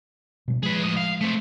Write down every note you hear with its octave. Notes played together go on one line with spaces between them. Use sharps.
B2 G3
F3 G#3 G#4 B4
A2 D#5
F5
A3 C4